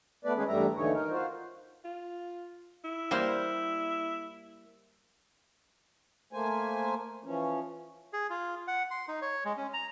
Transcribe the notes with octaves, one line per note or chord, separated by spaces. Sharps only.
A3 B3 B4 D5
D#3 G#3 B3 C#4 G#4 B4
E2 G2 G3 A3 E5 A#5
D#2 D3 E3 D#4 C#5
D#4 A#4
F4 F#4 C5
F4
E4
G3 A#3 C5
A3 A#3 C5 G#5
E3 F3 C#4
G#4
F4
F#5
C6
D#4
C#5
G#3
C#4
A#5